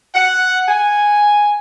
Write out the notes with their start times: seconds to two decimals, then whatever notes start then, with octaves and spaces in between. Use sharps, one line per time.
0.14 F#5
0.68 G#5